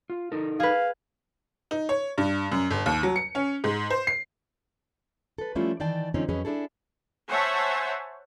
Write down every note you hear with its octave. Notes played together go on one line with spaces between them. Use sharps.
F4
D#4 A4 A#4
G#4 B4 F5
D#4
C#5
G2
F#2
G1
D#2
F#3
C#7
C#4
G#2
C5
C7
A4 B4
F3 G3 A3 C#4 E4 F4
D#3 E3 D5 G5 A5
D3 F3 C4 C#4 D#4
F2 F#3 C#4 G#4 B4 D#5
D4 E4 G#4 A4
C5 C#5 E5 F#5 G#5 A5